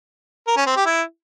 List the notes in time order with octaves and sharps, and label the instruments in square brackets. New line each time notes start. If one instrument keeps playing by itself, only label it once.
[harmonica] A#4
C#4
C4
G4
E4